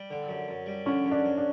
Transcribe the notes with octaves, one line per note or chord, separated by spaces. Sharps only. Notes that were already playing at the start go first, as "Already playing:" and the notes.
Already playing: G3
D3
F#2
F#2
G3
D3 C#4
F#2
D4
F#2
D4